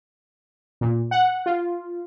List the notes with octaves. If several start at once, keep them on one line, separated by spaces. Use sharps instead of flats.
A#2
F#5
F4